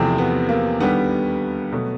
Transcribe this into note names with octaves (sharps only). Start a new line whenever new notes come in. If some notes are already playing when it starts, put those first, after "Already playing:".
Already playing: E2 C3 F3 A3 C4
B3
A#3
D#2 D3 G3 B3
B2 F#3 A3